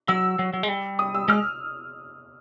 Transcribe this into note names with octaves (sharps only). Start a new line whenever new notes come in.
F#3 E6
F#3
F#3
G#3
G3
D#6
E6
G#3 F6